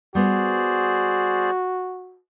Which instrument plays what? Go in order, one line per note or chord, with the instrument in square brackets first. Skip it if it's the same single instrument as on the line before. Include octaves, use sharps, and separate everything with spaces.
[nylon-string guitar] G3 B3 [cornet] F#4 [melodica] G#4 C5 D5